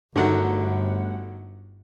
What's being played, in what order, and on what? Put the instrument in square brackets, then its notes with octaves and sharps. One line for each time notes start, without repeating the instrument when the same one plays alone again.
[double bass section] G1 [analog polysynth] G2 A3 F#5 [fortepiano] D3 D#3 F#3